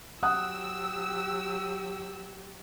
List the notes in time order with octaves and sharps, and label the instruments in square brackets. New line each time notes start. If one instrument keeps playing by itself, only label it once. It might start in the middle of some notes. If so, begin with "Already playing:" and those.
[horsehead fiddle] F#3 G4 [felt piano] F#5 D#6 F#6 [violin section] E6